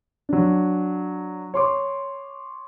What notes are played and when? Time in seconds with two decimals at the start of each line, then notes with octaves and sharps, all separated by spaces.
0.29 F#3 D4
1.54 C#5 C6 D6